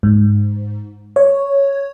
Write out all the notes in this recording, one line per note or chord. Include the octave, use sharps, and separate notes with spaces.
G#2
C#5